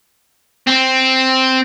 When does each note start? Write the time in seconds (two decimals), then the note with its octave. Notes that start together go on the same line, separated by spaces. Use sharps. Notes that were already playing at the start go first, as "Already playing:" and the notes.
0.67 C4